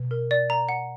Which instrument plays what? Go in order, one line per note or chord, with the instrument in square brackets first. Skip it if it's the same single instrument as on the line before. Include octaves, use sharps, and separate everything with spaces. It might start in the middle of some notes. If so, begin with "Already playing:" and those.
Already playing: [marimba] B2
[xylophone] A#4
D5
A#5
F#5